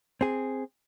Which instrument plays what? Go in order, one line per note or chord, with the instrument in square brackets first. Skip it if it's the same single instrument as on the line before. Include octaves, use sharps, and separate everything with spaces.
[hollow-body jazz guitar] C4 G#4